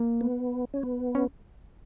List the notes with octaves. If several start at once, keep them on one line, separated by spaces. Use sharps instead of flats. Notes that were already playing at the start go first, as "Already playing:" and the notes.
Already playing: A#3
B3
C#4
B3
C#4